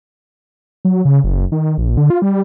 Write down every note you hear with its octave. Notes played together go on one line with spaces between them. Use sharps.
F#3
C#3
F#1
D#3
A#1
D3
F4
G3